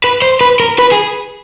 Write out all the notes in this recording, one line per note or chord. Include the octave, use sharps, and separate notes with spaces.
B4
C5
B4
A#4
B4
G#4